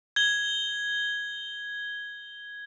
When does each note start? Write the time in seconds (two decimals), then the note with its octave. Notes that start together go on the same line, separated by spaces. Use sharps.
0.16 G#6 G7